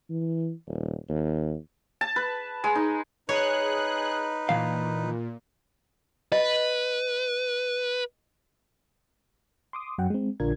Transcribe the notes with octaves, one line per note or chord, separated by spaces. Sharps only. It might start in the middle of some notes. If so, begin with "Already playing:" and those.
E3
D#1
D#2
A5
B4
G#3
D#4
D#4 G#4 B4 C#5 F#6
A#2 E3 F5
B4 D#5
C6 D6 D#6
F#2 F#3 F#5 G5
G#3 C4
A#1 D3 D4 F4 A#4 G#6